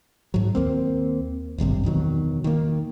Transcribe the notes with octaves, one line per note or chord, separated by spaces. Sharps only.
G#2 F#3
D#2 A#3 C4
D#1 G#1 G2 C3
E2 B2 D#3 F#3
D#3 A#3